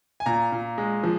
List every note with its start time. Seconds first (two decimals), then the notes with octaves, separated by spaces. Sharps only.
0.20 G#5
0.26 A#2 A#5
0.52 A#2
0.78 G#3
1.03 F3